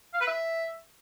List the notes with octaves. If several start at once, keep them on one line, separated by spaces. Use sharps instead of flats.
F5
B4
E5